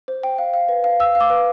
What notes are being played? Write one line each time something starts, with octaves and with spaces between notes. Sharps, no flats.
C5
G5
F5
F5
B4
F5
F5 E6
F5
D6
B4